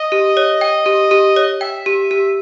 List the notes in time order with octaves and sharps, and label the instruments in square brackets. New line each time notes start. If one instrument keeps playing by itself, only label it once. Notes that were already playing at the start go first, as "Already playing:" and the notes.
Already playing: [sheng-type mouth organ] D#5
[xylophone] G4
C#5
G5
G4
G4
C#5
[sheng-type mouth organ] E5 [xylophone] G5
[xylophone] G4
G4